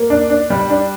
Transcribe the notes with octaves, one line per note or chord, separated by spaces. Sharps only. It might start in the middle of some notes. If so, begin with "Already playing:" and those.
Already playing: A#3
D4
D4
G3
D4